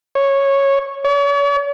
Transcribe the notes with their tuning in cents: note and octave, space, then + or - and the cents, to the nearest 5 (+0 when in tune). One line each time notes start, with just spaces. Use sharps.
C#5 -10
C#5 +40